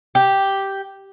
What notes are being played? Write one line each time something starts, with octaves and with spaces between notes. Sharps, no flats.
G4